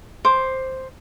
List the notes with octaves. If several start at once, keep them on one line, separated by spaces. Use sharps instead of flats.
C5 D6